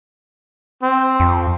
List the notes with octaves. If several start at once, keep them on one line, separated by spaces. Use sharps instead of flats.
C4
F2